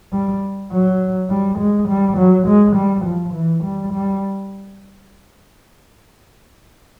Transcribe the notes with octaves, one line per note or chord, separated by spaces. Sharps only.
G3
F#3
G3
G#3
G3
F#3
G#3
G3
F3
E3
G3
G3